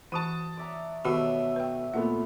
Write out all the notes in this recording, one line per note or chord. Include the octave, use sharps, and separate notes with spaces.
E3 F#4 A5 D#6 D#7
D5 E5 A#5
B2 D#3 F#3 A3 F#4 G4 E5 E6
B4 G5
A#2 A3 B3 F#5